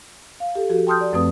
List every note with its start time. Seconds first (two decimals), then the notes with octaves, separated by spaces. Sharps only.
0.40 F5
0.55 G4 A4
0.70 F3 F#4 G4 A4
0.87 G5 A5 C6 D#6 F6 G6
1.01 D5
1.13 F#2 F3 A3 C4 B4 D#6